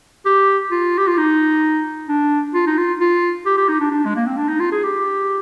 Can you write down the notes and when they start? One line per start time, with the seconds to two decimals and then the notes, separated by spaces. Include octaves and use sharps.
0.26 G4
0.71 F4
0.98 G4
1.08 F4
1.18 D#4
2.08 D4
2.54 F4
2.67 D#4
2.78 F4
3.00 F4
3.46 G4
3.57 G4
3.68 D#4
3.80 D4
3.92 D4
4.06 G#3
4.16 A#3
4.27 C4
4.37 D4
4.49 D#4
4.60 F4
4.72 G#4
4.83 G4